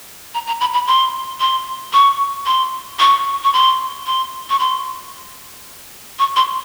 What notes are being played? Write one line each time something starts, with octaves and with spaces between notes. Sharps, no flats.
A#5
A#5
B5
B5
C6
C6
C#6
C6
C#6
C#6
C6
C6
C#6
C6
C#6
C6